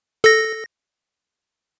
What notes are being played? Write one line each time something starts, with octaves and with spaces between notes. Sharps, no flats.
A4 A#6